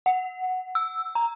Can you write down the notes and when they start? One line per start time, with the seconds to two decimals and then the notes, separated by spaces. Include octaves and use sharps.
0.06 F#5
0.75 E6
1.15 A#5